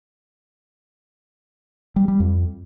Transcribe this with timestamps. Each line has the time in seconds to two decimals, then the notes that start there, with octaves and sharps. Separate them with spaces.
1.96 G3
2.08 G3
2.20 F2